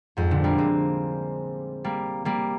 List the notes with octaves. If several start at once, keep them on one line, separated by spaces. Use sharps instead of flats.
F2 G#2
A#2 D3
G3 A#3
G#3 C4
G3 A#3
G3 A#3